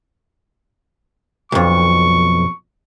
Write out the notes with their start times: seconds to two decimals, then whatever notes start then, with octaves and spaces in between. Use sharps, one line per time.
1.52 B1 F2 C#6